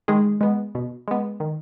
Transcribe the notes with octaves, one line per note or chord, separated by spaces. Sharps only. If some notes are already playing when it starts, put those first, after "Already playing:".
D#3 G#3 G#4
G#3 B3
B2
G#3 B3
D#3